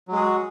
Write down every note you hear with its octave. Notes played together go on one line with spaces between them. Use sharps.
F#3 G#3 F#4 G#4